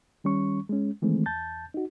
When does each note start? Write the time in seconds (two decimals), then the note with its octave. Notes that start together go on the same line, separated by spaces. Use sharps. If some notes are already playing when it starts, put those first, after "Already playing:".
0.24 D#3 G3 C#4 C#6
0.69 G#3 C#4
1.02 D#3 E3 G#3 A3 C4
1.26 E2 A5 G6 A6
1.74 D#4 F#4